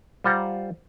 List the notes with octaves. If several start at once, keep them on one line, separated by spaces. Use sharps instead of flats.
G3 F4 C5 F#5 A#5